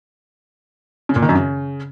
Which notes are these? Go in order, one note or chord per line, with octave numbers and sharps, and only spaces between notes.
C#3
A#2
D#3
F#2
C#3